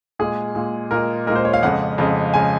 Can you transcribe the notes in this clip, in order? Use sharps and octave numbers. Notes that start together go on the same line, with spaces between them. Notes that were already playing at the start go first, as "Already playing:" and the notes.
A#2 G#3 G#4
A#2 G#3
A#2 G#3 A#4
A#2 G#3 A#4
C5
C#5
F5
F2 C#3 G#3 F#5
F2 C#3 G#3
C#3 G#3 G#5